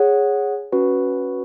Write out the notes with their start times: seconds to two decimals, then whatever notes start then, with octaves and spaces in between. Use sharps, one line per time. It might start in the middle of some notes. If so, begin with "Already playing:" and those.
Already playing: G#4 C#5 F#5
0.72 C#4 F#4 B4